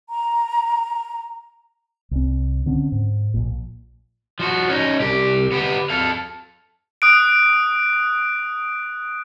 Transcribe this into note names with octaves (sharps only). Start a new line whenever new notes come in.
A#5
C2 C4
D3 C4 C#4
G#2
A#1 A#2
F3 F#4
C#4 D#4
C2 G4
B3 G4
A4 F5
D#6 F#6 D7